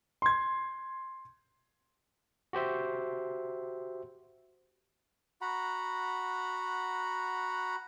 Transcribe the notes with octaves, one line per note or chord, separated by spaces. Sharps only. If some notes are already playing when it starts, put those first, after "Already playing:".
C6 G#6
F#4 G4 C5 E5
F#4 F#5 A#5 B5